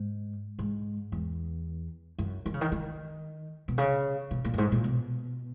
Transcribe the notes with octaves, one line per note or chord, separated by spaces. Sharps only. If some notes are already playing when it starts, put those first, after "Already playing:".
Already playing: G#2
G#2
E2
F#2
D#3
C#3
D#3
D#3
B2
C#3
B2
A#2
F#2
G#2
A#2
B2